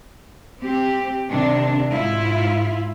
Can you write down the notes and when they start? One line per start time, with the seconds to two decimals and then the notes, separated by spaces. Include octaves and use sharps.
0.62 C4 G4
1.30 C3 D#3 D4
1.91 G#2 E4 F4